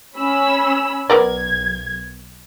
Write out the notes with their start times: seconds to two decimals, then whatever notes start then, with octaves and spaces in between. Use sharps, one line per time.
0.17 C#4 B5 E6
1.10 B1 B3 A#4 D5 G#6